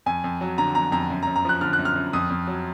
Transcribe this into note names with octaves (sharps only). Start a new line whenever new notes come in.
F2 G#5
F2
F#3
D3 A#5
F2 A#5
F2 A#5
F#2
A#5
F#2
A#5
F3 F#6
D3 F6
F#6
F#2
F6
F#2
F2 D#6
F2
F#3